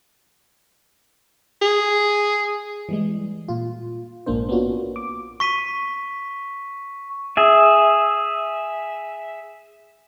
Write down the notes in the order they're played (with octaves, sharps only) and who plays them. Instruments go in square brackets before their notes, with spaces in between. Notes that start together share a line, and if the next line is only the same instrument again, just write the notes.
[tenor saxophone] G#4
[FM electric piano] E3 G3 G#3
A#2 F4
A#1 G#2 A#3 D4 C5
A#3 B3 C#4 D4 F4 F#4
D6
[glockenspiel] C#6 B6 D#7
[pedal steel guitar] G#4 E5